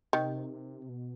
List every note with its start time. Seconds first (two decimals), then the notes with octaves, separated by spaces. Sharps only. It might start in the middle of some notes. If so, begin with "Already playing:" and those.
0.13 C3 D#3
0.89 B2